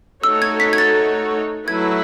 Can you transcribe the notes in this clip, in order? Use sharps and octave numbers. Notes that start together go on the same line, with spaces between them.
A3 D#4 F#4 A4 C#5 E6
G#6
B6
G#6
A6
F#3 A3 E4 B4 G#6